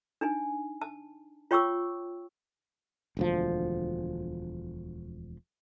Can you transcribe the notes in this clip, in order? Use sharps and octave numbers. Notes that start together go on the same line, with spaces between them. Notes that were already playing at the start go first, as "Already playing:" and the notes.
D4 D#4 G#5
A5
F4 C#5 G5 C#6 D6 E6
E1 D2 F3